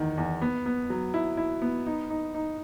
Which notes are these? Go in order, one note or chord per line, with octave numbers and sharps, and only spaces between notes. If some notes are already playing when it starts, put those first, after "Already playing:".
Already playing: E2 D#3
E2
B3
B3
F#3
E4
E4
B3
D#4
D#4
D#4